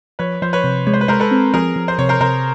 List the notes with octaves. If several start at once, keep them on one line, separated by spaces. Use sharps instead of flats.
F3 B4 C#5
F3 C5
B4 C#5
C3
G#3 C#5
C5
B4
G#3 A#4 C5
A4 B4
C4
F3 G#4 A#4
F3
C5
C3 C#5
A#4 C5
C3 A#4 C5